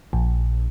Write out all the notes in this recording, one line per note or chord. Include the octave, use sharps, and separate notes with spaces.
A#1